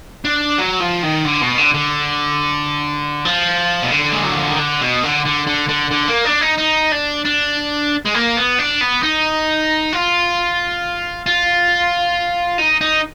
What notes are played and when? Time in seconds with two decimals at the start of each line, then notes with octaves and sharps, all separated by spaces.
0.25 D4
0.58 F#3
0.80 F3
1.03 D#3
1.25 D3
1.42 B2
1.58 D3
1.74 D3
3.25 F3
3.82 B2
3.91 D3
4.12 G#3
4.23 F#3
4.35 F3
4.47 D#3
4.59 D3
4.81 B2
5.03 D3
5.25 D3
5.47 D3
5.69 D3
5.91 D3
6.08 A#3
6.25 D4
6.41 D#4
6.58 D#4
6.92 D4
7.25 D4
8.05 G#3
8.14 A#3
8.37 B3
8.59 D4
8.81 B3
9.03 D#4
9.93 F4
11.26 F4
12.59 D#4
12.81 D#4